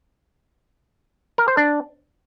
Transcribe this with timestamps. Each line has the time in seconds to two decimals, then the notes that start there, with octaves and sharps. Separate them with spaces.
1.38 A#4
1.48 C5
1.57 D4